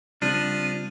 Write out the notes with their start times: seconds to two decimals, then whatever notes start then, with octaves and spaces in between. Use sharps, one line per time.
0.22 C#3 F3 G3 C4 D4 D#7